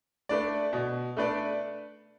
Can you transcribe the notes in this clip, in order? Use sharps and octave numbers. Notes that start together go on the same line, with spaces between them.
A3 D4 B4 D5
B2
A3 D4 B4 D5